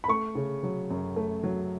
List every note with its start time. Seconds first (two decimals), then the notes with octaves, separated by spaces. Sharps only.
0.04 B5
0.08 A3 C#6
0.35 C#3
0.63 F#3
0.90 F#2
1.16 A3
1.44 F#3